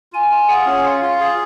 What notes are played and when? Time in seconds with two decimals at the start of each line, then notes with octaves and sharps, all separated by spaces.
0.13 F4 G#5
0.31 F4
0.49 G#4 F#5
0.66 C#4
0.84 F4 F5
1.02 F4
1.20 G#4